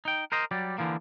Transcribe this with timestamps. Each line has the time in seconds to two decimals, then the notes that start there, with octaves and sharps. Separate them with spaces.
0.05 D#4 G5
0.32 A#4 C5 D#5
0.51 F#3 G3 D5
0.78 D3 E3 F3 A#3